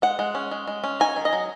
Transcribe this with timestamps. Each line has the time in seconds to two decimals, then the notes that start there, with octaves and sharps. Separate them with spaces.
0.02 G#3 F#5
0.19 G#3
0.35 C#4
0.51 G#3
0.67 G#3
0.84 C#4
1.00 D#4 G#5
1.16 D#3
1.25 D#5
1.33 F#3